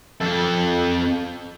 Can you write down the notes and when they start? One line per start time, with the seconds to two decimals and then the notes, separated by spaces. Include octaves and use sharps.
0.21 F2 A4